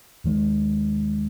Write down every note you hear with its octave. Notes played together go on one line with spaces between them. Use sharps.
D#2 D#3 G#3